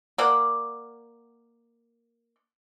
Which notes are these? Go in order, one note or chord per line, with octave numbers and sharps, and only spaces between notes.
A#3 D5 F#5